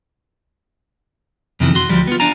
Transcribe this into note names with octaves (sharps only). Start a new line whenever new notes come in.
F2 C3 D#3 E3
F#4 C6
D2 F3 G3
B3 F4
D4 F5 G#5 A#5